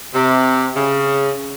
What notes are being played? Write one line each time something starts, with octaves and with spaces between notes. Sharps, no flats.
C3
C#3